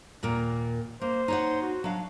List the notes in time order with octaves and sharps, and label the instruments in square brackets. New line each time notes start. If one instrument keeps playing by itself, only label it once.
[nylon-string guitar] D#2 A#2 A#4
[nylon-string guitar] A#3 [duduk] C5
[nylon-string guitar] D#4 C#5 F#5
[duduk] F#4
[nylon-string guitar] F#3 F5 [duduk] D4